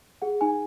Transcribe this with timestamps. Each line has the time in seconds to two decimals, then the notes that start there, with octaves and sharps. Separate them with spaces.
0.22 G#4 F#5
0.41 D#4 G#5